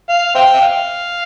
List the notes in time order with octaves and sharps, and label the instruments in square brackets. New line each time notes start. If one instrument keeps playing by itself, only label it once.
[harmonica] F5
C5 E5 G5
E5
F5